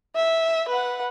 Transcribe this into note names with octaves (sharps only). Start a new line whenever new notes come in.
E5
B4 F#5